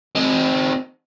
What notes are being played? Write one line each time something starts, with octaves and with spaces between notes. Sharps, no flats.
C4 D#4